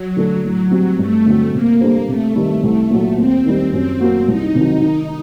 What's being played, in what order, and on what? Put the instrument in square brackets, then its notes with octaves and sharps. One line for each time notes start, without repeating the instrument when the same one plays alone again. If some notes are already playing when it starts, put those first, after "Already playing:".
Already playing: [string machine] F#3
[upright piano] D3 A3 D4 A4
[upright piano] A2 [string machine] F#3
[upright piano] G3 C4 F#4
[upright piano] G2 [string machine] A3
[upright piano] D3 F#3 C4
[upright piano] C3 [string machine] A#3
[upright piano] G3 D4 A4 C5
[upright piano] C3 [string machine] A3
[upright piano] D#3 G3
[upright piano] C2 [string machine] A3
[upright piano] A#2 F#3
[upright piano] D#2 [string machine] C4
[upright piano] D#3 G3
[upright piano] F#2 [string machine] C4
[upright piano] F#3 A#3 F#4
[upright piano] C2 [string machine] D#4
[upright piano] C3 D#3 F#3
D#3